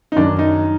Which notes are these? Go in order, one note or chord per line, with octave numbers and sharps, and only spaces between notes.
D#4
F#2 D#3 D4
D#4